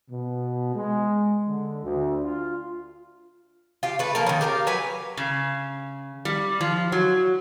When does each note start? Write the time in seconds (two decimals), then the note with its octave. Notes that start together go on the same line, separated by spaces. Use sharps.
0.11 B2
0.75 G#3
1.48 D3
1.84 D2
2.24 F4
3.83 F4 G4
3.99 A3 B4
4.15 F3 A#3 A#4
4.27 D#3 C#4
4.41 G4 A#4 F5
4.67 F#3 B4 G#5
5.17 C#3
6.25 G3
6.61 F3
6.92 F#3